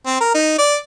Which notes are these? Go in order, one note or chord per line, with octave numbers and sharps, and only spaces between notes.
C4
A#4
D#4
D5